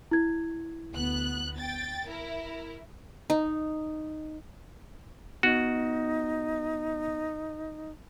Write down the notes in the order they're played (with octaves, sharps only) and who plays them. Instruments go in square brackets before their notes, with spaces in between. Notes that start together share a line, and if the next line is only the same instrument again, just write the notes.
[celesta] E4 G#6
[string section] D2 B3 F#6
G5 A6
E4 A#4
[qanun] D#4
[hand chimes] B3 [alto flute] D#4 [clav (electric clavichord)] F#4